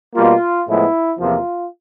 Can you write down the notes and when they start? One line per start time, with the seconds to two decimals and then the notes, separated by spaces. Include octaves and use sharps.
0.15 B2 G3 A#3 F4
0.67 A2 F3 G#3 B3 E4
1.19 E2 C3 F3 A#3 F4